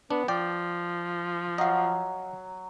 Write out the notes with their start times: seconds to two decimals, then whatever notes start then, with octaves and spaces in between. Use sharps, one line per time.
0.10 B3 D4
0.28 F3 D5 G5
1.58 F#3 D#5 F5